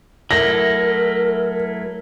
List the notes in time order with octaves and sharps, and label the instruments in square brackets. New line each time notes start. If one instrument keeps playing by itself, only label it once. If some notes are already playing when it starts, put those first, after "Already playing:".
[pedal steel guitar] F#3 A3 E4 [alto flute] A#4 [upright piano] A#6